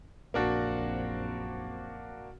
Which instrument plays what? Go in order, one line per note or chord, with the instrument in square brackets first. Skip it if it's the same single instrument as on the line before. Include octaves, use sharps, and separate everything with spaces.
[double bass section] A#1 F#2 C4 [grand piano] A#3 D4 F#4